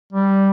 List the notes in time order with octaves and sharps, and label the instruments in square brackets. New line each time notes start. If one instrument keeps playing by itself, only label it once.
[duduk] G3